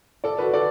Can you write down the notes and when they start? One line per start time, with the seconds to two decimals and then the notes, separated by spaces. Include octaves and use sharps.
0.24 A4 D5
0.39 F#4 B4
0.54 A4 D5